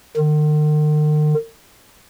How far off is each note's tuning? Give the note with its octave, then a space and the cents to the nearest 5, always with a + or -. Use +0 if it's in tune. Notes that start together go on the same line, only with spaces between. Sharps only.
D#3 -45